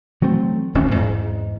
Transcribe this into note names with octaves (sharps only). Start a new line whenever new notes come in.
E3 F#3 A3 C4
D1 D#2 C4 C#4
E2 G#2